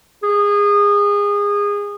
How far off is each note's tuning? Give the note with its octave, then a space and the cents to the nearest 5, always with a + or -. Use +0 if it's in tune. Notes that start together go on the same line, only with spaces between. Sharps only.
G#4 -25